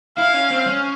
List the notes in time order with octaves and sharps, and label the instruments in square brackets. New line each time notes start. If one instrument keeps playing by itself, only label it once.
[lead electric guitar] E4 [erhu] F5
[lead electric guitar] C#4
C4
C#4